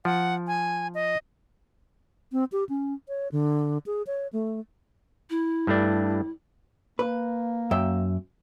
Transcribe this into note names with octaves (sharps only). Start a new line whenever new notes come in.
F3 F#5
G#5
D#5
C4
G4
C#4
C#5
D3
G#4
C#5
A3
E4
G2 A3 D4
A#3 B4
F#2 E5 G5